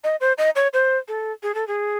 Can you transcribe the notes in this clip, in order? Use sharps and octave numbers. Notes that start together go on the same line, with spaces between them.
D#5
C5
D#5
C#5
C5
A4
G#4
A4
G#4